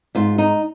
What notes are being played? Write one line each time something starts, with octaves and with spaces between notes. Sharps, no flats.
G#2 F4
D#4